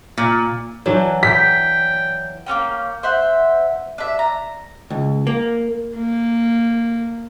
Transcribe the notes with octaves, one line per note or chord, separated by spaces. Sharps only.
A#2
E3 F#3 D4 C#5
G5 B6
A#3 B3 C#4 G5
C5 E5 F#5
D4 E5
A#5
C#2
A#3
A#3